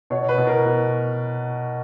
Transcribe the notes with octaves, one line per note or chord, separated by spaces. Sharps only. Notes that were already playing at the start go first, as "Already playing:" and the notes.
B2 C#5
B4
B2
A#4
B2